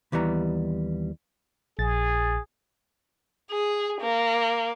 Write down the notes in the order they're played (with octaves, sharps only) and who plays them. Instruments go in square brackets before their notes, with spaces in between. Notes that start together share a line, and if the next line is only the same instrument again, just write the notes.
[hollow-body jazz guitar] D#2 E3 G3 B3 A#5
[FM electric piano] A#1 A6 [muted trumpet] G#4
[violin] G#4
A#3